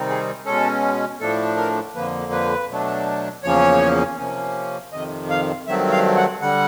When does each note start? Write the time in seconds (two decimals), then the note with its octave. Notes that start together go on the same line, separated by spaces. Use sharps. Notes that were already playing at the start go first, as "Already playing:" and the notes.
Already playing: C3 D#3 G3 C4 D#4
0.09 G#4
0.45 B2 G#3 C#4 A4
1.21 A2 F3 A3 D4 A4
1.57 A#4
1.95 F2 D3 F3 A#3 B4
2.32 B4
2.69 B2 F#3 A3 D4
3.43 E2 C#3 F3 A#3 C#4 C#5
4.18 C3 F3 A#3 C#4
4.92 F2 C3 D#3 D#5
5.30 F5
5.67 G2 D#3 F#3 A3 C4 E5
5.92 F5
6.17 F#5
6.41 D3 G3 F#5